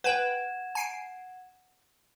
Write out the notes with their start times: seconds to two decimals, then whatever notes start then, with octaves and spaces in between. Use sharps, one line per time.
0.04 B4 F#5 G5 G#6 E7
0.75 G#5 C7 D7